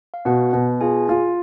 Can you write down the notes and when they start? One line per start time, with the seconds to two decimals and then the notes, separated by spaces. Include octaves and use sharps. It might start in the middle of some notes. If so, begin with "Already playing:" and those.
0.14 F5
0.25 B2 F#4 F#5
0.53 B2
0.81 F4 G#4 G#5
1.09 F4